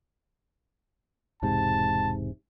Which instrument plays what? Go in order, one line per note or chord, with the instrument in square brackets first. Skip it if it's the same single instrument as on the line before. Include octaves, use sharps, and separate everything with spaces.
[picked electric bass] E1 G#2 C3 [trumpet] A5